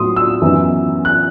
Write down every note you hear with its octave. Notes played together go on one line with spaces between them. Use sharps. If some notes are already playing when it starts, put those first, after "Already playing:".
Already playing: A2 F#3 B3 D#4 C6 D#6
E6
F#2 E3 B3 D#4
F#6